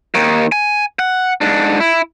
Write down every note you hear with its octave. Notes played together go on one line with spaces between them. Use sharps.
D#2 D#3
G#5
F#5
G#2 D4
E4